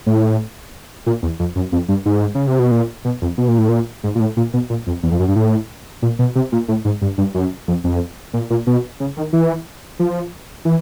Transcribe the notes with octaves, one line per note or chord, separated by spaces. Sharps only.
A2
A#2
E2
F2
F#2
F2
G2
G#2
C#3
C3
B2
A#2
B2
F2
B2
A#2
A2
A#2
G#2
A#2
A2
A#2
B2
A#2
F2
E2
F2
F#2
G2
A2
A#2
B2
C3
A#2
A2
G#2
G2
G2
F#2
F2
F2
A#2
A#2
B2
C#3
D#3
E3
F3
E3